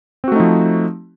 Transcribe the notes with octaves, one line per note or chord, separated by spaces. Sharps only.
F3 A3 C4 D#4 F#4